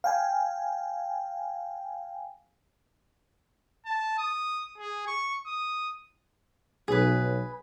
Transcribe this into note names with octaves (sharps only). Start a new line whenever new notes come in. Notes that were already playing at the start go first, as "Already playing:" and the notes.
F5 G5 G#5
A5
D#6
G#4
C#6
D#6
B1 G#4 B4